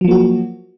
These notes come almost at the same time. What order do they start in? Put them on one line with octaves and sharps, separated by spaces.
F#3 F3 A#3 F#4